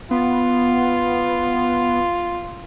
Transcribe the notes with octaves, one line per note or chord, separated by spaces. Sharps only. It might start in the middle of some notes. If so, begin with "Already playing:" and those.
B3 F4